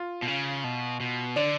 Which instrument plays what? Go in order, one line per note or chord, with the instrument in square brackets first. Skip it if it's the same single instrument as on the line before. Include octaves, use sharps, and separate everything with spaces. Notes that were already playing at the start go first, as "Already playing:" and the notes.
Already playing: [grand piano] F4
[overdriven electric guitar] B2
C#3
B2
B2
[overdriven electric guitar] D3 [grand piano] D4